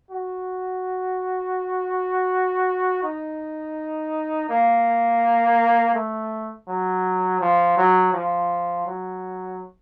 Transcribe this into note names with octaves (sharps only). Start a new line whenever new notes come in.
F#4
D#4
A#3
A3
F#3
F3
F#3
F3
F#3